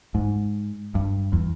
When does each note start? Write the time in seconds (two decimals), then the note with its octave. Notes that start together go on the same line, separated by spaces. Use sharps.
0.15 G#2
0.95 G2
1.33 E2